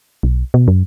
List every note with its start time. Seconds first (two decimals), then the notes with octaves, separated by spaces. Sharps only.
0.23 B1
0.54 B2
0.68 F#2